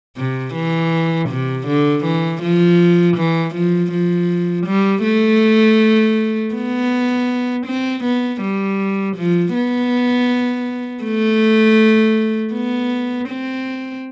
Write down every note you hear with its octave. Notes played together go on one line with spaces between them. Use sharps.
C3
E3
C3
D3
E3
F3
E3
F3
F3
G3
A3
B3
C4
B3
G3
F3
B3
A3
B3
C4